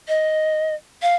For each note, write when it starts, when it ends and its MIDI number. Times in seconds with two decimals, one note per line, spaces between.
0.08 0.74 75
1.02 1.16 77